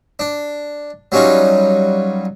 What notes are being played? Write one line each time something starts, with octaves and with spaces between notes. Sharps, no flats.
D4
F#3 G3 C#4 D#4 F4